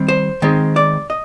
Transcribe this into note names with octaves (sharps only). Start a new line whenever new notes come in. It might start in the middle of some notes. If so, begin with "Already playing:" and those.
Already playing: D#3 G3 C4
C5
D#3 G#3 C4
D5
D#5